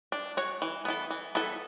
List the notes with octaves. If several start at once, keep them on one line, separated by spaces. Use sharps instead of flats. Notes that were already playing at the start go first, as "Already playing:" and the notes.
D4
F#4 C#5
E3
B3 E4 A4
E3
B3 E4 A4